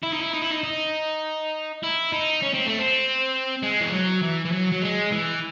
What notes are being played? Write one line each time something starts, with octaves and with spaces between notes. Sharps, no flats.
E4
D#4
E4
D#4
E4
D#4
D#4
E4
D#4
C#4
C4
A3
C4
G#3
E3
F#3
E3
E3
F#3
F#3
G#3
E3